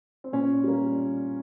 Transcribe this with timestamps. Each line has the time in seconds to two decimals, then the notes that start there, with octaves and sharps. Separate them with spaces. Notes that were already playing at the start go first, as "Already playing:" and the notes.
0.24 C4
0.33 A#2 C#4
0.64 G3 A#3